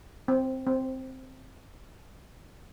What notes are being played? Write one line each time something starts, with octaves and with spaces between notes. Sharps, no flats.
C4
C4